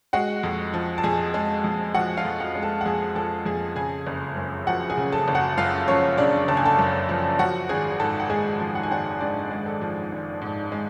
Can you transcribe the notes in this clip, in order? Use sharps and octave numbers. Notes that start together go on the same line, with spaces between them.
G#3 F#4 F#5
F2
F3
A5
F2 G#4 G#5
G#3
F2
F3 F#4 F#5
F4 F5
F2
F#4 F#5
G#3
A4 A5
F#5
F2 G#4 G#5
F3 A4 A5
F2 G#4 G#5
C#3 G#4 G#5
F#1
F#2
F3 F#4 F#5
G#4 G#5
C#3
A4 A5
F#1
F#4 F#5
F#2 F4 F5
F3 C#4 C#5
C#3 D4 D5
F#1 A5
G#5
A4 A5
F#2
F3
F3 F#4 F#5
G#1 G#4 G#5
G#2 A4 A5
F#5
G#3 G#4 G#5
F3
F#5
G#5
G#1 F#4 F#5
G#2 D4 D5
G#3
A4
F3
G#1
G#2
G#3